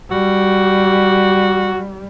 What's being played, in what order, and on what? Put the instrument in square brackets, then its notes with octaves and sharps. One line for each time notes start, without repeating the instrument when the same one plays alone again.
[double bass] G3 [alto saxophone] F#4